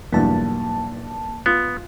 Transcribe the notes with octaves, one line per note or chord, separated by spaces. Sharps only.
B1 E2 G2 A#3 A5
B3 F4